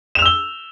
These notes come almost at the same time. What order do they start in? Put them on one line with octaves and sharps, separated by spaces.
E7 F7 E6 G7